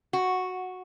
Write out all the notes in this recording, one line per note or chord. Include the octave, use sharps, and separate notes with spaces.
F#4